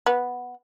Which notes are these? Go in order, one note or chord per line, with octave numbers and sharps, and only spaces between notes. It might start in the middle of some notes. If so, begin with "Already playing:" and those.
B3